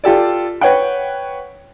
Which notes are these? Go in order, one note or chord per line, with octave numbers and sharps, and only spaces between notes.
F4 G4 A4 D5
B4 C#5 F#5 G5